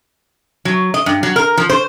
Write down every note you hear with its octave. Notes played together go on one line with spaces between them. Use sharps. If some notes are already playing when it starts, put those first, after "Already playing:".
F#3
D#5
G2
F#3
A#4
F3
C5